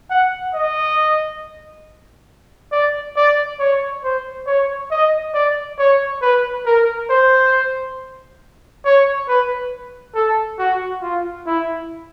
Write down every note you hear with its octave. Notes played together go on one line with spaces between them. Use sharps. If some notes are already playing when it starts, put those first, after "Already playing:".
F#5
D#5
D5
D5
C#5
C5
C#5
D#5
D5
C#5
B4
A#4
C5
C#5
B4
A4
F#4
F4
E4